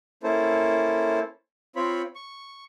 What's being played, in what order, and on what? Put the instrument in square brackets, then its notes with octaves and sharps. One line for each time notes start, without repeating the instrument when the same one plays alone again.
[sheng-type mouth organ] A#3 C#4 E4 A4 C5
C4 F4 C#5 B5
C#6